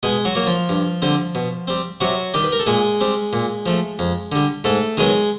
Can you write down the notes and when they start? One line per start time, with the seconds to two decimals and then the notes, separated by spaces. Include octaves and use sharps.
0.03 B2 G#3 G#4
0.25 F#3 F#4
0.35 F#3 A#3
0.47 F3 F4
0.69 G2
1.02 D3 G3 C4
1.35 B2
1.68 G3 C4
2.00 C3 F#3 F#4
2.34 D#3 G3 G4
2.44 B4
2.52 A#4
2.60 A4
2.66 A#2 G#3 G#4
3.01 G3 C4
3.33 A#2
3.66 F3 A3
3.99 F2
4.32 D3 G3
4.64 G#2 A3 A4
4.97 D#3 F#3 G#3 B3 G#4